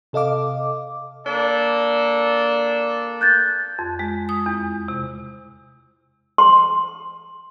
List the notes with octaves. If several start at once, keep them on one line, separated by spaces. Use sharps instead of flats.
C3 A4 D#5 F5 D6
A#3 D4 A4
F#6 G6 A6
F2
G#3
D#6
E2
C3
C6